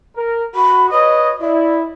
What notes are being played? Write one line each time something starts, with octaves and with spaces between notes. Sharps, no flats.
A#4
F#4 B5
B4 C#5 D#5 D#6
E4 D5